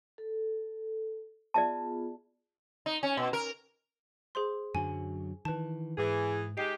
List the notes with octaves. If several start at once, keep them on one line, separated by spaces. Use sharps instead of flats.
A4
B3 F4 G#4 D5 E5 A5
D#4
C#4
B2
A#4
G#4 C5 C6
F#2 D3 F#3 G#5
D#3 E3 B4 A5
G#2 E3 G#4
G#3 D#4 G4 C7